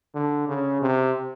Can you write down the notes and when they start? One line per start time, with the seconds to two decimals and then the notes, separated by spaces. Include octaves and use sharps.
0.15 D3
0.48 C#3
0.82 C3